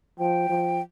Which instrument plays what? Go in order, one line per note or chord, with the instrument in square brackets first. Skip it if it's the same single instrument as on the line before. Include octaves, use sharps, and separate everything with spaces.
[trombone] F3 [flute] G5
[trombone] F3